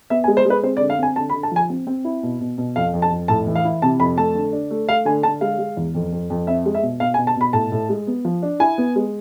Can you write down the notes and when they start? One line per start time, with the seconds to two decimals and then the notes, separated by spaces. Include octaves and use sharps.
0.10 B3 E5
0.24 G#5
0.28 G#3
0.37 C5
0.45 G#3 B4
0.63 C4 C5
0.77 D5
0.81 D3
0.90 F5
0.98 C4 G#5
1.16 D3 A5
1.29 B5
1.34 D3
1.43 A5
1.51 F3 G#5
1.70 C4
1.87 C4
2.05 E4
2.23 B2
2.41 B2
2.58 B2
2.76 F2 F5
2.94 F2
3.02 A5
3.11 F2
3.28 A2 A5
3.47 E3
3.55 F5
3.65 E4
3.82 C3 A5
4.00 F2 B5
4.17 A3 A5
4.35 D3
4.53 D4
4.71 A3
4.88 A3 F5
5.05 D3 G#5
5.23 D3 A5
5.41 G#3 F5
5.58 G#3
5.77 E2
5.95 F2
6.12 F2
6.30 F2
6.47 C4 E5
6.66 G#3
6.75 E5
6.82 B2
7.00 B2 F5
7.14 G#5
7.18 B2
7.27 A5
7.36 B2 B5
7.53 A2 A5
7.72 A2
7.89 G#3
8.07 B3
8.25 F3
8.42 D4
8.60 E4 G#5
8.78 B3
8.96 G#3